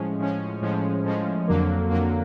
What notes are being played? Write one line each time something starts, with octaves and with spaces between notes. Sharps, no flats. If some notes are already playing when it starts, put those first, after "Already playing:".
Already playing: A2 F3 G#3 C#4
A2 F3 G#3 C#4
A2 F3 G#3 C#4
A2 F3 G#3 C#4
F2 D3 F#3 A#3
F2 D3 F#3 A#3